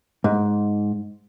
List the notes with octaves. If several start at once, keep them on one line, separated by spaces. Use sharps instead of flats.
G#2